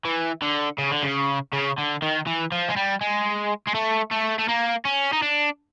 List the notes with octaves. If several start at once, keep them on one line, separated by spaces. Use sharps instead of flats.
E3
D3
C#3
D3
C#3
C#3
D3
D#3
E3
F3
G#3
G3
G#3
G#3
A3
A3
A3
A#3
C#4
D#4
D4